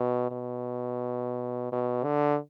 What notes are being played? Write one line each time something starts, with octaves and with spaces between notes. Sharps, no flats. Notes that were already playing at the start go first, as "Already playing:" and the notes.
Already playing: B2
B2
B2
D3